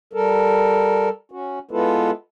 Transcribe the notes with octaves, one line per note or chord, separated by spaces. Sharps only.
G3 A4 A#4
C#4 F#4
G#3 B3 E4 F4 A4 B4